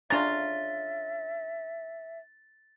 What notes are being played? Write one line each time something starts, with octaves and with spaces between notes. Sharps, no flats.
C#3 D4 F4 E5 A#5 A6